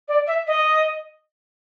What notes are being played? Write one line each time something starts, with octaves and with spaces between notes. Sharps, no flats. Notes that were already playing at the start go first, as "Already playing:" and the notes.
D5
E5
D#5